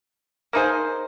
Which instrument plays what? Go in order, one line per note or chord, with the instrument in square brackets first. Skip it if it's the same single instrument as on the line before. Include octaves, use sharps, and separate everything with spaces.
[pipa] A#3 D#4 G#4 C5